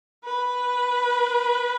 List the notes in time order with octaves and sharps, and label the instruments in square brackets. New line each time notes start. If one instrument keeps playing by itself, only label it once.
[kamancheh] B4